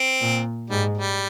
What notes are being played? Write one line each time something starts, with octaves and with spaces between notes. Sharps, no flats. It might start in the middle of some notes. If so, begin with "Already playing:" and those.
Already playing: C4
A#2
G#2 G3
G3